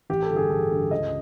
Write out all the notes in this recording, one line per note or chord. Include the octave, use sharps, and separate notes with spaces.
A1 G4
A4
G2 D3
G#4
A1 A4
G2 D3
C#2 D#5